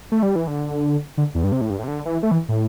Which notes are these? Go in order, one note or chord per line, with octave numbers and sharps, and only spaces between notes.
A3
G3
E3
D3
D3
E2
G2
C3
A2
G2
A2
C3
D3
E3
A3
E3
A2